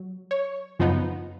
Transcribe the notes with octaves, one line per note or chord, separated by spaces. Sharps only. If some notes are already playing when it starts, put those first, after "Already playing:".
Already playing: F#3
C#5
F#2 C#3 F3 B3 D#4